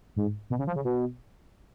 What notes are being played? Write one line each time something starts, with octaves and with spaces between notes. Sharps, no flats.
G#2
B2
C#3
F3
C#3
B2